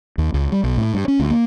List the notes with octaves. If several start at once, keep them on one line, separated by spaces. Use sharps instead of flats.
D#2
C#2
G3
B1
A2
G2
C#4
D2
A#3